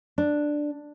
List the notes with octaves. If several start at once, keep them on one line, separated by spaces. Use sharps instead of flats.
D4